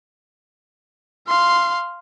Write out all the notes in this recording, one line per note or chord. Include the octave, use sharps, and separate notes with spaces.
F5 C6